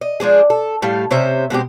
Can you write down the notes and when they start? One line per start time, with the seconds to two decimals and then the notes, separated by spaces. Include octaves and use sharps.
0.01 D#5
0.20 F3 G#3 D4 G#4
0.50 A4
0.82 A2 G3 A4 F5
1.11 C3 C#4 C5 E5
1.50 B2 G#3 C4 G4